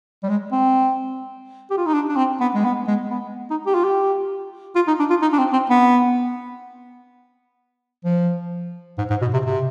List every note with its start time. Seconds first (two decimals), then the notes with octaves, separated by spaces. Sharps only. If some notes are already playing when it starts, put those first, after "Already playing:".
0.23 G3
0.29 G#3
0.52 C4
1.70 G4
1.77 F4
1.86 D#4
1.93 D4
2.09 D4
2.16 C4
2.40 B3
2.55 G#3
2.64 B3
2.87 G#3
3.10 B3
3.51 D#4
3.66 G4
3.75 F4
3.84 G4
4.76 F4
4.88 D#4
4.99 D4
5.10 F4
5.22 D#4
5.33 D4
5.38 C4
5.53 C4
5.70 B3
8.05 F3
8.98 G#2
9.10 G#2
9.21 B2
9.33 C3
9.46 C3